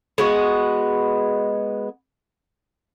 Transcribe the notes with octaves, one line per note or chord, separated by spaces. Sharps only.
G#3 B3 F#4